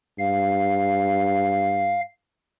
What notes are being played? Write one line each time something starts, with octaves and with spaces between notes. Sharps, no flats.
G2 F5